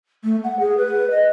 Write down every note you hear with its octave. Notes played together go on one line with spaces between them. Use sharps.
A3
F#5
G#4
B4
D#5